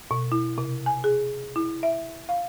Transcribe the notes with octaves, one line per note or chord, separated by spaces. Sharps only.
B2
E4
C3
G#5
G#4
E4
E5
F5